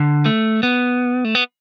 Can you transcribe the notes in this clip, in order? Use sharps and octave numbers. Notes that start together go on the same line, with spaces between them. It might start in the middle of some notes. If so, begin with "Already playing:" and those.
Already playing: D3
A3
B3
A3
B3